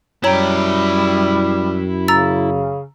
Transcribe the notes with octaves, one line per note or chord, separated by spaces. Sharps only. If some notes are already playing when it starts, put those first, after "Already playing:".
F#2 G3 E4 C#5 G5 A#5
C#3 A#5 E6 A6